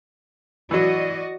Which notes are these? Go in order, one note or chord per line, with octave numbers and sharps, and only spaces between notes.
E3 F#3 F#4 D5 D#5